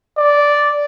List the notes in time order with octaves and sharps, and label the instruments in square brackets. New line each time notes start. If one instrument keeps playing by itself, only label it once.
[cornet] D5